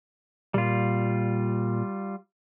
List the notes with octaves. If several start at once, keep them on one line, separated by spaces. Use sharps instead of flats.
A#2 G3 F4